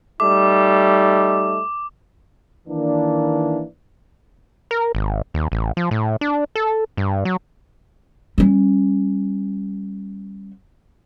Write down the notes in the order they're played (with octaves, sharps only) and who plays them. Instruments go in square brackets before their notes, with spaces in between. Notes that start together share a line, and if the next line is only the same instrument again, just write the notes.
[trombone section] G3 A3 D#4 [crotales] D6
[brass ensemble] D#3 E3 A#3 D4
[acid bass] A#4
G#1
D#2
A1
F3
A2
D4
A4
G2
F#3
[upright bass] G3 C#4